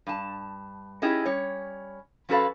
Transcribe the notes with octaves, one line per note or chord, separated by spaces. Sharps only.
G2 A5
C#4 D#4 E4 G4 G#4
G3 C#4 C#5
F3 C#4 F#4 A4 B4 F5